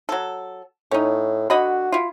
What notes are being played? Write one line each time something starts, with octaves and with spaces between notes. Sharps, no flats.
F#3 A4
A2 C#4 D#4
D3 F#4 D#5 B5
E4 F4